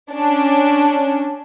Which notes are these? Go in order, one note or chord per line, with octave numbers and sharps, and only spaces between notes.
C#4 D4